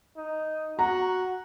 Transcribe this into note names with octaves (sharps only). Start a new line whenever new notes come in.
D#4
F#4 A#5